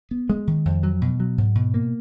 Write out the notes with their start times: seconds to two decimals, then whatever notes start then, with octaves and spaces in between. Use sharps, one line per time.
0.11 B3
0.30 G#3
0.47 D#3
0.65 F2
0.83 F#3
1.02 B2
1.20 F#3
1.38 G#2
1.55 B2
1.74 A#3